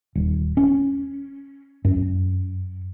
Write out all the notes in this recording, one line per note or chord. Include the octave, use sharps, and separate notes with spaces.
D#1
C#4
F#2